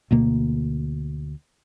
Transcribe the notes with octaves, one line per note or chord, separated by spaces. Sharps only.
D2 B2 A#3